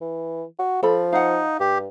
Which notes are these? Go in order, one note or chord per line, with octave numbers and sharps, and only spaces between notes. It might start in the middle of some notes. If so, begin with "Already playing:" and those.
E3
F#4
F3 A4 B5
D#4 F5 F#5
G2 G4